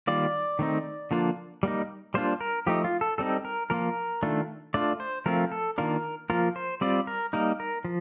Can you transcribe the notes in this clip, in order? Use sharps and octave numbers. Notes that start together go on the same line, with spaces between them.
D#3 G3 A#3 F4 D5
D#3 A3 C4 D#4
D3 F3 A#3 D4 F4
G3 A#3 D#4
G3 A#3 D4 F4 C5
A#4
F3 A3 D#4 G4
F4
A4
G3 C4 D#4 A4
A#4
F3 A#3 F4 A#4
D#3 A3 D4 F4
A3 D4 F4 D5
C5
F3 A3 C4 F4 A#4
A4
D#3 A#3 D4 F4 A#4
F3 A#3 F4 A#4
C5
G3 C4 F4 D5
A#4
G3 A#3 D#4 A#4
A#4
F3